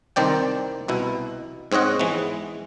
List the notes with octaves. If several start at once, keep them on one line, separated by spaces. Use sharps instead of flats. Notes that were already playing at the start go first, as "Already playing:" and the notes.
C2 D#3 C4 D5 G5
C2 B2 E4
G#2 C4 C#5 D#5 F#5
E3 G#3 B3